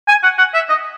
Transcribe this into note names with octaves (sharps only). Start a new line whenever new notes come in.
G#5
F#5
F#5
E5
D#5